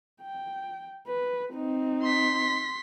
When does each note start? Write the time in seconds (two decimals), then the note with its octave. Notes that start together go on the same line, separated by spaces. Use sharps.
0.22 G5
1.07 B4
1.50 C4 D#4
2.02 C6 B6